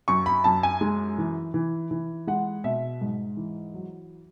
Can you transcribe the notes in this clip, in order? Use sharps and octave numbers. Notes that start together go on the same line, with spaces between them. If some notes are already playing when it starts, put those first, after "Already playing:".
F#2 C#6
B5
F#2 A5
G#5
G#3
E3
E3
E3
G#3 F#5
B2 E5
G#2
E3
F#3